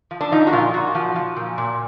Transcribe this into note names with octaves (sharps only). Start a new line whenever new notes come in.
F3
D4
F3 D#4
F#4
A#2 F4
A#2 F#4
F3
F3
A#2
A#2